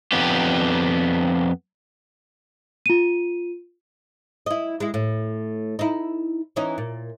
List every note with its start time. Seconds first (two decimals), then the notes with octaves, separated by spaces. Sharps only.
0.12 F2 B3 G4
2.86 F4 D#7
4.46 E4 D#5
4.80 G#3 E4
4.94 A2
5.79 D#4 E4
6.56 E3 C#4 D#4
6.78 A#2